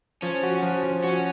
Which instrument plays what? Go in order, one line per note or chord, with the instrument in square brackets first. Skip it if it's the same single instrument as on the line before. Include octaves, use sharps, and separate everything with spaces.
[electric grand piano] F3 [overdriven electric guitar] C#4
[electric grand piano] F#4
F3
F3
[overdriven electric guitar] C#4 [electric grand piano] F#4